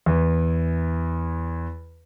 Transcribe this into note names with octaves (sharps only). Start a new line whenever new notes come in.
E2 E3